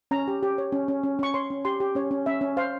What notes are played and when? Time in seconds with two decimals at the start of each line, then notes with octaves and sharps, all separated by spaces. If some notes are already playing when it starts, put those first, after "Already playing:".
0.11 C#4 A#5
0.28 G4
0.43 G4
0.58 C#5
0.72 C#4
0.88 C#4
1.03 C#4
1.19 C#4 C#6
1.34 C#5 C6
1.50 C#4
1.65 G4 C6
1.80 G4
1.95 C#4 C#5
2.11 C#4
2.26 C#4 E5
2.41 C#4
2.57 C5 F5